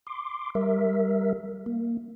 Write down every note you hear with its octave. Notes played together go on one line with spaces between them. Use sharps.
C6 D6
G3 A#4 E5
A#3